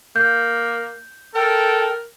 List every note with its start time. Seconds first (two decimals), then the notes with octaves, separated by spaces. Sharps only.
0.16 A#3 G6
1.35 A4 A#4 G5